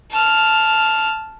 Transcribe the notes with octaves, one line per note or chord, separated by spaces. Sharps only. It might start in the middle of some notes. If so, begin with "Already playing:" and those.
A5 F6